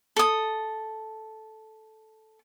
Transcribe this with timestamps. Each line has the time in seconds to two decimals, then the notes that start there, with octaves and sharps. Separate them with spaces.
0.16 A4 D#6